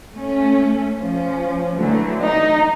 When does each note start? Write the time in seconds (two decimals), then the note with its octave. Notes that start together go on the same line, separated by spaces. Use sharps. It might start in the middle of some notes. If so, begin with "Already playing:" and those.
0.14 A3 C#4
0.95 F3 C#4
1.76 D3 E3 F#3 A3
2.22 D#4